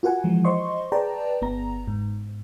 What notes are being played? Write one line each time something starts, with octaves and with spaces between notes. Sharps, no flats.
F4 F#4 A#4 F#5 G#5
E3 F3 G#3
C5 D#5 C6 C#6
G#4 B4 D5 G5 A5 A#5
G1 B3 A#5
G#2